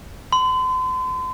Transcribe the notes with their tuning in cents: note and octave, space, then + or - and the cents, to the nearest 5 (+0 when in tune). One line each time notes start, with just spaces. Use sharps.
C6 -40